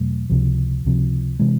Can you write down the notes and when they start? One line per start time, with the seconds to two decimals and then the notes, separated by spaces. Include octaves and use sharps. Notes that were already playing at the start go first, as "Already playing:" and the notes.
Already playing: E2 B2 F#3 A3
0.30 C#2 C3 F3
0.85 C#2 C3 F3
1.39 C3 E3 G#3